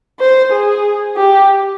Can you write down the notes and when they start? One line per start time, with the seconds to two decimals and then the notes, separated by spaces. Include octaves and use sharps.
0.19 C5
0.52 G#4
1.16 G4